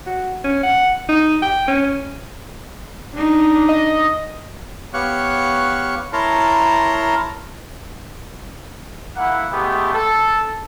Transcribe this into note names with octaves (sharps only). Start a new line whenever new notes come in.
F#4
C#4
F#5
D#4
G5
C#4
D4 D#4
D#5
B3 G4 C#5 F5 C#6 F#6
E4 A#4 C#5 A5 A#5 C6
A#3 E4 F#5
G#3 A3 B3 G4
A4